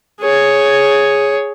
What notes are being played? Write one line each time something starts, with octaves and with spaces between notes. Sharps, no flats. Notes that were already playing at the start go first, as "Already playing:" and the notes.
G#4 C#5